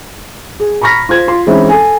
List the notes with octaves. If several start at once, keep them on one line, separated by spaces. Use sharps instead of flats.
G#4
A#5 B5 C#6 F6 A#6 B6
F4 C5 G#6
F4 C6
E3 G#3 C4 C#4 D#4 E4
A4 G#5